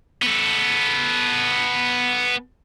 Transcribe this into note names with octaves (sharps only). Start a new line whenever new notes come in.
B3 A4